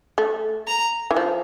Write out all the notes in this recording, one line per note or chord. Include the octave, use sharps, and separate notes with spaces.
A3
A#5
E3
F3